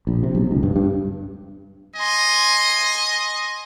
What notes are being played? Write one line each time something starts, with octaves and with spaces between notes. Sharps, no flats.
A#1
C3
B1
C#2
G2
G2
D#5 G#5 C6